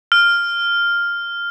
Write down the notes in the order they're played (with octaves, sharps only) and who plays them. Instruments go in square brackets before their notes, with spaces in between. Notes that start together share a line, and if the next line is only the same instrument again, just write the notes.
[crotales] F6